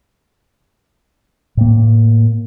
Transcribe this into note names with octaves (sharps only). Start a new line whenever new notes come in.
A2 A#3